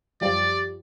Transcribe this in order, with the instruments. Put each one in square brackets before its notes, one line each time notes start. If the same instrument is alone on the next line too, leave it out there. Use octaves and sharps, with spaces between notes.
[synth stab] F#2 F3 G3 [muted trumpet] D5